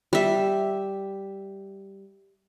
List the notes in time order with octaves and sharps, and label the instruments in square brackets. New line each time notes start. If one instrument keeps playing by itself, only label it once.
[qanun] G3 E5